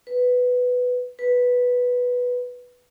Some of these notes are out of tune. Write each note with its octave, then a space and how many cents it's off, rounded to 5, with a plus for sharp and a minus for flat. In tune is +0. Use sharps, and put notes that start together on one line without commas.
B4 +5
B4 -5